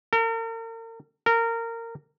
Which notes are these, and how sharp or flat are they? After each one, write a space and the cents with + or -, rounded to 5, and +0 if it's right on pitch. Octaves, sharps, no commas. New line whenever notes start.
A#4 -40
A#4 -20